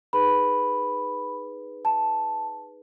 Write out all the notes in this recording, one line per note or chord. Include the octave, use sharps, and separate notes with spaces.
D#4 G#4 B4 B5
A5